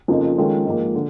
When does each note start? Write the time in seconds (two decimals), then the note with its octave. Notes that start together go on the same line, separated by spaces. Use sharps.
0.08 F2 C#3 F3 A#3 D#4
0.38 D#3 G#3 C#4 F4 A4
0.66 G#2 F3 A#3
0.95 D3